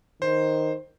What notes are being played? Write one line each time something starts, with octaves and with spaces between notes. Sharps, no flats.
D#3 C5